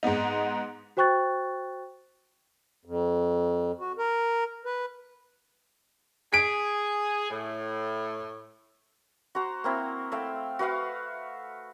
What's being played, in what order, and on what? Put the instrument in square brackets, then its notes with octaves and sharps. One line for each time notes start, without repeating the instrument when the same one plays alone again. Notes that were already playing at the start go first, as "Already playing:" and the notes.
[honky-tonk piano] G#2 G#3 B3 D#4
[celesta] F#4 C5 G5 C#6 F#6 A6
[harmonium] F2
F#4
A#4
B4
[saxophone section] G#4 [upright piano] B6 D7
[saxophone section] A2
[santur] F#4 C5 A#5
A#3 C4 E4
A3 E5 F5 G5
F#4 B4 E5 F5